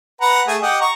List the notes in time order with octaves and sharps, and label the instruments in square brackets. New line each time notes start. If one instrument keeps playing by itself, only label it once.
[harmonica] B4 F#5 A#5
A3 G#4 G#5
G4 D#5 F#5
A#5 C#6